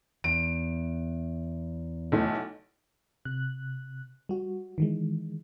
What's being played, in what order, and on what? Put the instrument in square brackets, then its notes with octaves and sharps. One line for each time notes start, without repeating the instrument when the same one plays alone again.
[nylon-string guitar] E2 [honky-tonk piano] D7
[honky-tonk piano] B1 E3 A3
[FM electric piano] C3 F#6
G3 F#4
D#3 E3 G#3